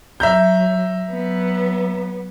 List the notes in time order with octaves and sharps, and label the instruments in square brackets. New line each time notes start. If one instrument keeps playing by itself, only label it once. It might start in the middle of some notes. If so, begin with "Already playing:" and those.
[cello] F#3 [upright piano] E5 A#5 G6
[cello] F#3 B3